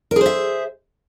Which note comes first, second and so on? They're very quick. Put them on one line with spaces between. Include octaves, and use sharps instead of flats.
A#4 G#4 C5 E5